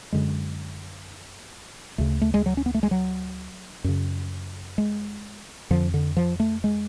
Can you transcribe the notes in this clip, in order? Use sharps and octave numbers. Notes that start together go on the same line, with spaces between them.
F#2 D3 G#3
D2 C#3 A3
A3
G#3
F#3
C#4
B3
A3
G#3
F#3
F#2 C#3
G#3
F2 D3 F3
D3
F3
A3
G#3